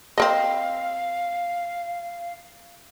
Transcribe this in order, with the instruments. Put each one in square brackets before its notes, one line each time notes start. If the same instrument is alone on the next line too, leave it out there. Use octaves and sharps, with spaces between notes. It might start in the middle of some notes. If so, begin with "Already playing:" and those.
[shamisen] C4 A#4 D#5 [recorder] F5